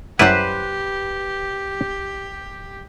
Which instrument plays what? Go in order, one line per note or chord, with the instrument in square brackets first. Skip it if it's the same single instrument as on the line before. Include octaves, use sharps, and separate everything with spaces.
[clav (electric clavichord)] F#2 G3 E4 [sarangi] G4 [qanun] B4 C5